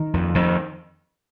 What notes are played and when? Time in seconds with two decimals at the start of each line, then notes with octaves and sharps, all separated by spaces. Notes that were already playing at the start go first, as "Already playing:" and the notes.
Already playing: D#3
0.14 F2
0.35 F2 D#3